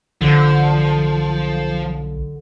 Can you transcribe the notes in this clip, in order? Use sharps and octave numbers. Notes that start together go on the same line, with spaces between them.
B1 D3 F3